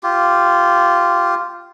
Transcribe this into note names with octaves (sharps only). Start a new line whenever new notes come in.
F4 G4